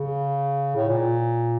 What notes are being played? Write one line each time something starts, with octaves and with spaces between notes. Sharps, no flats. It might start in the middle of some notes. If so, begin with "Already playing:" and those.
Already playing: C#3
A2
A#2